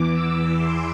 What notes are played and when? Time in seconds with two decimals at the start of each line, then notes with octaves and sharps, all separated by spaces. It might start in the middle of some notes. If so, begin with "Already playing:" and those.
Already playing: E2 E3 D6
0.13 E6
0.58 C6